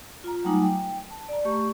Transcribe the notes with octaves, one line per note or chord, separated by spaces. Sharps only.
F4 A#5
F#3 G3 A3 D#4 G#5 D6
G5
A5
D5 A#5
A3 G4 C#6